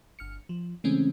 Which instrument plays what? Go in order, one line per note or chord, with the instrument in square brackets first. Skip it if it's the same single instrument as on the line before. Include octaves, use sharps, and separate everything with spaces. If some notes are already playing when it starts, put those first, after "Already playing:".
[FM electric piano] G1 F6 C#7
F3
C#3 E3 G#3 A3 C4 C#4